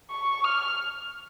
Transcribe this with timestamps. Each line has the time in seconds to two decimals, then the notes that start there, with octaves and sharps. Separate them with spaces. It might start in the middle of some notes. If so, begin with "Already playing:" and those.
0.11 C#6
0.44 F6